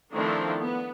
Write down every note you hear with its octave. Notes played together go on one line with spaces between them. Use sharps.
D#3 F3 A3 C4 D4 E4
B3